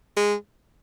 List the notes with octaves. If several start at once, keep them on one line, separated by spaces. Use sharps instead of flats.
G#3